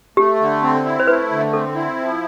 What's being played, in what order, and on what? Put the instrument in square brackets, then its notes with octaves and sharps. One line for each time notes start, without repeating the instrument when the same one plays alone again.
[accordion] A3 [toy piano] G4
[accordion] D3
C4
E4
[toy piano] C5
[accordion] A3 [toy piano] B4
[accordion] D3
[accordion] C4 [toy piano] A4
[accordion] E4
F3